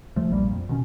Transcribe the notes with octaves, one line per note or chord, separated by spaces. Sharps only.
E2 F3 A3
A#1 G3 A#3
F2
B2 D#3 C#4